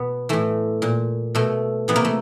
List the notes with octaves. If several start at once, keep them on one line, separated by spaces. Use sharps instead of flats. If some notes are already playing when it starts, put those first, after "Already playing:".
Already playing: B2 B3
A2 E3 A3
A#2
B2 A3
C3 E3 B3
A#3
A3